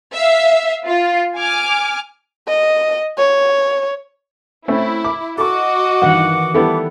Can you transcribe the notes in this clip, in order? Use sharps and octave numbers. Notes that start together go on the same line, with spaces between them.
E5 F5
F4
G#5 D6 F6
D#5
C#5
A3 C4 C#4 E4
D6
F#4 A4 D#5 C#6 D6
G2 D#3 E3 F#5
G3 B3 E4 A4